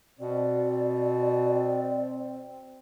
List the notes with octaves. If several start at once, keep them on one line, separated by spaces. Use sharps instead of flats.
B2 C4 D5